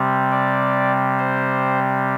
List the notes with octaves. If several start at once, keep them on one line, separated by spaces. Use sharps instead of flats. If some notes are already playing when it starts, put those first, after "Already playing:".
Already playing: C3 G3 C4
D5
C5